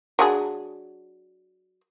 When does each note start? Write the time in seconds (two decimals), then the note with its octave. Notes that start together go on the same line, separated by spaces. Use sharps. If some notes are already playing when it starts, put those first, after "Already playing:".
0.19 F#3 D4 G#4